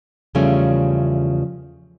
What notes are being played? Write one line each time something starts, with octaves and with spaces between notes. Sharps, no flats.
E2 C#3 F3 G3 A3 C#4